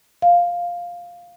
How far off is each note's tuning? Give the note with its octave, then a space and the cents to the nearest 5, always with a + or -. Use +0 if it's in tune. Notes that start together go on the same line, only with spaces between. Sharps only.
F5 +5